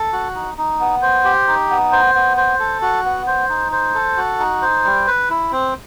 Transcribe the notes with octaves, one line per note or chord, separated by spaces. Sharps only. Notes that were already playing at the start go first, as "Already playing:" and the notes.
Already playing: A4
F#4
D#4
D#4
B3
C5
G4
D#4
B3
C5
B3
C5
A4
F#4
B3
C5
D#4
C5
A4
F#4
D#4
C5
G3
B4
E4
C4